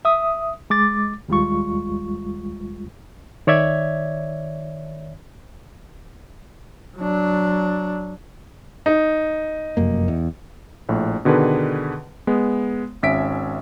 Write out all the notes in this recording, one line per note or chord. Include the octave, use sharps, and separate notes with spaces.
E5 D#6
G#3 D6 A6
D#2 G3 G#3 F4 C#6
D#3 C#5 D5 E5 G#6
F#3 D4
D#4
F1 F#2 A#3
E2
A#1 A2
B2 D3 D#3 G#4 B4
G#3 B3
G#1 C#4 E5 B6 D7